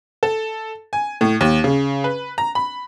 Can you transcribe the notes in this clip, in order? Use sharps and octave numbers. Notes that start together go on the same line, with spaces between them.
A4
G#5
A2
D#2
C#3
B4
A#5
B5